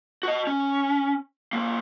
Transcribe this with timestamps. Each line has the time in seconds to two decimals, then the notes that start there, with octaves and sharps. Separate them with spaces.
0.23 F#4 D#5
0.47 C#4
1.53 B1 A#3